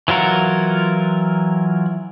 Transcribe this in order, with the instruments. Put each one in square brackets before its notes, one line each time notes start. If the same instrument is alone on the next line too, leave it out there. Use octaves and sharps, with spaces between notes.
[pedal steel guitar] E3 F#3 F4 A#4 F#5